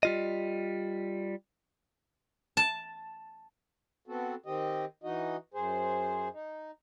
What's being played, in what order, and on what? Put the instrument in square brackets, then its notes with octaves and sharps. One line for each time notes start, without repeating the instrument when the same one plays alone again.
[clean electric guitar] G3 F4 D#5
[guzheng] A5
[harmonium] B3 C4 F#4 A4
D#3 C4 G4 D#5
E3 D#4 F#4 D#5
F#2 G#4 C5
D#4